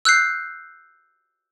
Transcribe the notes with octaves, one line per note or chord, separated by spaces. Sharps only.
E6 F#6 G6 C7